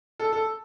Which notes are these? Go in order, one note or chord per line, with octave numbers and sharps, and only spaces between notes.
A4
A4